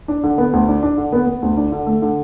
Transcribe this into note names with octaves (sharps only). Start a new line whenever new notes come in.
D4
D3
B3
D2
D4
D4
D3
B3
B3
D2
D4
D3
A3
D3